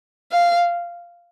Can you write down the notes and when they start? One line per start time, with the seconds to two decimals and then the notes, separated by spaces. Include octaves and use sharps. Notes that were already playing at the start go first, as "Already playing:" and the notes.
0.32 F5